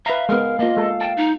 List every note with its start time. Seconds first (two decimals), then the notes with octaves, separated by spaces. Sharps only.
0.06 B4 E5 F5 A#5
0.29 G#3 B3 A#4
0.59 A#3 F4 D#5
0.77 G#3 A4
1.01 G5 A5
1.17 D#4